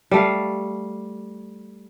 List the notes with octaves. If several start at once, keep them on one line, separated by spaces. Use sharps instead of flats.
G3 A3 F5